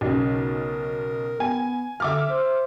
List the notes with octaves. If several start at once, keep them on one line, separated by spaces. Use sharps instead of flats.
B1 C#3 A#4
B3 G#5
D3 E5 D6 F6
C5